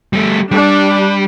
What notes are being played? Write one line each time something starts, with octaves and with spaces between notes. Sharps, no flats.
G3 A3
G3 D4